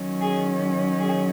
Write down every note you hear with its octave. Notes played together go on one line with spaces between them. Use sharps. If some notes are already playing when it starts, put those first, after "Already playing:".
Already playing: D#3 F#3 C#4
G#4
G#4